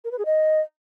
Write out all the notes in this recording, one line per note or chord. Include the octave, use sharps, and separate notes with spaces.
A#4
B4
G#4
D#5